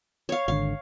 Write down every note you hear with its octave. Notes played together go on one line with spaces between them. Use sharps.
C#5 F5
G#1 D3 F5